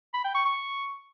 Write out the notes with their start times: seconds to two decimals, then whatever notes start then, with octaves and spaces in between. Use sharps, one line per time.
0.14 B5
0.24 G5
0.35 C#6
0.45 C#6